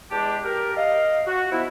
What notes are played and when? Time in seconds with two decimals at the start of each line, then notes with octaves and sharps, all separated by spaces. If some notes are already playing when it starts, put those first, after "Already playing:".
0.11 E2 G#3 D4 G4 A5
0.45 G4 A#4
0.76 D#5 F5
1.27 F#4
1.52 F3 B3 E4